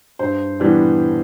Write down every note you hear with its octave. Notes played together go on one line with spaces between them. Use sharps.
G2 C5
E3 G3 B3 D4